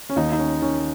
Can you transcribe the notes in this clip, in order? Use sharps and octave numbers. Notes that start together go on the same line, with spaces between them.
C#4
D#2 D#4
D#4
C#4
D#3 C#4